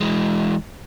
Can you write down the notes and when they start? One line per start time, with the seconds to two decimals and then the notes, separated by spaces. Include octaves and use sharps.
0.01 E3 G#3